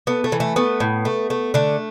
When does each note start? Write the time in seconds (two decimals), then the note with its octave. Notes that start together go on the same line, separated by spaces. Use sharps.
0.07 A3 B3
0.24 A3
0.32 E3
0.40 A3
0.56 A3 B3
0.80 A2
1.05 A3
1.30 A3
1.54 D3 A3